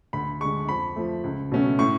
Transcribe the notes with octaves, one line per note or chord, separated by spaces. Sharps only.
D2 B5
D3 G#3 C#6
F2 B5
F3 A3
C#2
B2 F#3 A3 C#4
A2 C#6